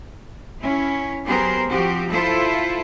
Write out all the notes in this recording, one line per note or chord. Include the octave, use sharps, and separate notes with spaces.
C#4 E4
F#3 B3 G4 G#4 A#4 C5
F3 C4 F#4 G4
E4 F4 A4 C5 E5